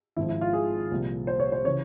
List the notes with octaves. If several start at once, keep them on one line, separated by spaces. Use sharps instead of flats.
G#1 G#2 F3 E4
E4
F4
G#4
C2 A#2 F3
C5
C#5
C5
C#3 E3 C#5